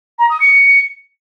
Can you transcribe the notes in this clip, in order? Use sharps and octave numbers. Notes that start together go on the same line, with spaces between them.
A#5
D#6
C#7